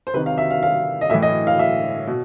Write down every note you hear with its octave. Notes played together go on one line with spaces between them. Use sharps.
C5
C3 D#3 B4
F5
E5
F5
F5
D#5
A2 E3 E5
D#5
F5
E5
B2